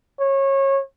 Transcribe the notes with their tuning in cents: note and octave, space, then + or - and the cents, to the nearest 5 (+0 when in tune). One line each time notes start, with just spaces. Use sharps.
C#5 -25